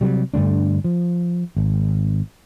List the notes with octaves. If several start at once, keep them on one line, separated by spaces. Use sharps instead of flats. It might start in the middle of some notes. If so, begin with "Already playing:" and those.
C3 F#3 G3
G2 D3 A3 D4
F3
G#1